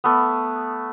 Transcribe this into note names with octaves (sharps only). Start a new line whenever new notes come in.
A3 B3